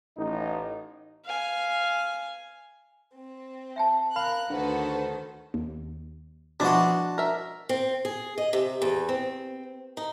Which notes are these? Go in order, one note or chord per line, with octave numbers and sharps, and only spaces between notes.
A1 D#4
F5 G#5
C4
E5 G5 A5
A#4 F5 B5 F#6
D2 D#3 D4 F#4 A4 B4 C5
D#2
B2 E3 F3 G#3 D4 F#4
A#4 E5
C4
G#4
D#5
C3
E2
C4
D#4